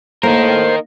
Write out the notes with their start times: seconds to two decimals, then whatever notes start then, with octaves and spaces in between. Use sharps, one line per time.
0.23 A2 A#3 D#4 A#4 C5